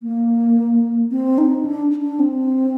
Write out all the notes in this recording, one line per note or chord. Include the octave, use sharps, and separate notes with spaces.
A#3
C4
D#4
D4
D4
C4